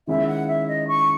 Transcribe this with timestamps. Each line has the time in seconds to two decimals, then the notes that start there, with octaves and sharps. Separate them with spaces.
0.07 D#3 G#3 C#4 E4 E5
0.27 F#5
0.48 E5
0.67 D#5
0.88 C#6